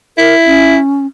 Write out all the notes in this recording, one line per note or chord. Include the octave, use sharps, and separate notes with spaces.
E4 A#4
C#4